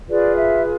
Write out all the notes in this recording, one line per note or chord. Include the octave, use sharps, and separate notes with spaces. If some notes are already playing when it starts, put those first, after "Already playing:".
F4 G#4 B4 D5
E5